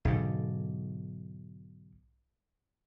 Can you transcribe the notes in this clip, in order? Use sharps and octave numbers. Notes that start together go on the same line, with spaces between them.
B1 G#2 D3